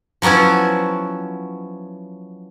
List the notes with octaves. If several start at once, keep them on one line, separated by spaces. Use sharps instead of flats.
F3 F#3 B3 C#4 E4